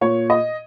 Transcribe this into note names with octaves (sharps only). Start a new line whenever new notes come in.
A#2 C#5
D#5